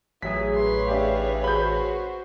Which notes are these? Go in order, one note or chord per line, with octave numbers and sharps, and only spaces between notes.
A1 F#3 G#4 E5 B6
B4 C#5 C6
D4 G4 E5 F5
F#4 C5 B5 G6